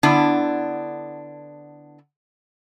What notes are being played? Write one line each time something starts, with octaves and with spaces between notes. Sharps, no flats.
D3 B3 D4 E4